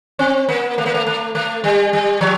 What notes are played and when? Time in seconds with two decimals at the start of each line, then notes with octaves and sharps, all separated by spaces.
0.19 C4
0.49 A#3
0.78 A3
0.86 A#3
0.94 A3
1.07 A3
1.35 A3
1.64 G3
1.93 G3
2.21 F3